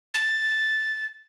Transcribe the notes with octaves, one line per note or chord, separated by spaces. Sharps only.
A6